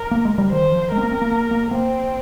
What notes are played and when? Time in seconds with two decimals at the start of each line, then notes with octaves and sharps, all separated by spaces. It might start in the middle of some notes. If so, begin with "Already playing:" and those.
Already playing: A#4
0.11 A#3
0.25 G#3
0.38 G3
0.52 D#3 C5
0.72 F3
0.92 G#3 A#4
0.97 C4
1.02 A#3
1.11 C4
1.22 A#3
1.32 A#3
1.51 A#3
1.71 A#3 C4